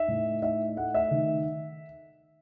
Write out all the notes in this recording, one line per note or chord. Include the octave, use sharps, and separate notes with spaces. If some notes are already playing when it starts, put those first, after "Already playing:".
Already playing: D#4 E5
A2
D#4 E5
A3 F#5
E5
D#3